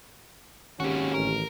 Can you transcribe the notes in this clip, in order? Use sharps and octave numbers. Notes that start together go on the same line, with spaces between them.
G#1 D#3 A#3 C#4 F#4 G4
A1 A#4